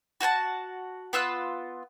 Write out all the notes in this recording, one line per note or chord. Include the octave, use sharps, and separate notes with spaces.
F#4 F#5 G#5 A5
B3 F4 E6 F#6